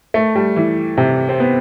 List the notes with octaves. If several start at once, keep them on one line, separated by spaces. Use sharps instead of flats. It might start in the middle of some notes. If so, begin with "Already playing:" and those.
A3
G3
E3
C3
C4
B3